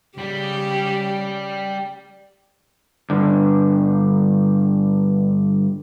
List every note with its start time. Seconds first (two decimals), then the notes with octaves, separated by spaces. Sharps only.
0.18 C#3 G3 G4
3.10 G2 D3